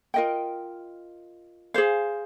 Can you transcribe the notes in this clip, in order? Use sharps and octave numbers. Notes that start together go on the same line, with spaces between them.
F4 A#4 D#5 G5
G#4 C5 F5